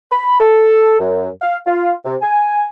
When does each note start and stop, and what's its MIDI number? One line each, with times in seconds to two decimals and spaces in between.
0.11 0.37 83
0.40 0.97 69
1.00 1.29 42
1.42 1.57 77
1.67 1.93 65
2.05 2.16 48
2.22 2.67 80